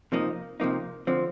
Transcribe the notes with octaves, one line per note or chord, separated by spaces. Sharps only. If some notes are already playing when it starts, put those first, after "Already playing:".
C3 F3 A#3 D#4
C3 F3 A#3 D#4
D3 F3 C4